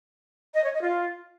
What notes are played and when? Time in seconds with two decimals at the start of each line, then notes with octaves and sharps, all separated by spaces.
0.55 D#5
0.64 C#5
0.73 D#5
0.82 F4